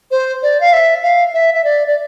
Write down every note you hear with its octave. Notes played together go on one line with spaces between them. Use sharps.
C5
D5
F5
E5
F5
E5
E5
D5
D5